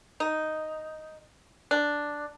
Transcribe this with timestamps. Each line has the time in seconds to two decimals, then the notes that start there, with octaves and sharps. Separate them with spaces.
0.20 D#4
1.71 D4